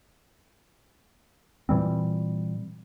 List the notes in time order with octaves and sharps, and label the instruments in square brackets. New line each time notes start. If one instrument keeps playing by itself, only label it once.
[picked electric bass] A#2 E3 G3 C4